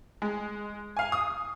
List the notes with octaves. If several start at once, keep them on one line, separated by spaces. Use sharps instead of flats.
G#3
F5 G#5
D#6